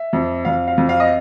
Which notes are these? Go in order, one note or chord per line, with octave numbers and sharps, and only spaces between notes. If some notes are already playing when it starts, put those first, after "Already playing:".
Already playing: E5
F2
F2 F5
F5
F2
F5
D#5